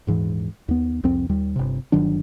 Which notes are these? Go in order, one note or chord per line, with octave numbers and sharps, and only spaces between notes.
D#1 G#2 E3
D#2 B3
C2 F2 C4
D#2 G3
G1 C3
G1 D#3 F#3 D4